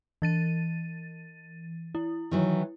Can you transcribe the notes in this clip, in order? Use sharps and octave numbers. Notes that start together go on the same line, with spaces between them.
E3 A6 D#7
E4
D#3 E3 F#3